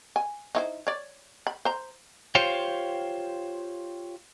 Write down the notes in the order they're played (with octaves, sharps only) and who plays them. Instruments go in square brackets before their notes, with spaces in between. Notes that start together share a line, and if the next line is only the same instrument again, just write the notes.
[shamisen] G#5
D#4 E4 C5
C#5 D5
B5
C5 A#5
[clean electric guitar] F4 G4 C5 C#5 F5 G5